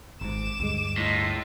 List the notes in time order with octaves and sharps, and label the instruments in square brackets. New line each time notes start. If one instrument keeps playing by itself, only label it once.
[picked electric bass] G#1 G#2 [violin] D6 E7
[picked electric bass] D2 G2 G#3
[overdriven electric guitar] A2 [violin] D#4 F4